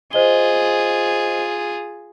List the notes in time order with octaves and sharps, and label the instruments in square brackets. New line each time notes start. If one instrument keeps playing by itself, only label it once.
[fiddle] F4 G#4 [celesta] C5 D#5 G7